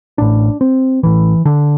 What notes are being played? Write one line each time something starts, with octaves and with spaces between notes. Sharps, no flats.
A1 A2 D4
C4
A1 A2 E3
D3